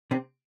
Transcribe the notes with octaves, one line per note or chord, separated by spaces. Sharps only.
C3 C4